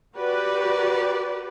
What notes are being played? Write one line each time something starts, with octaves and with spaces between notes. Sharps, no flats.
F#4 G4 B4 D5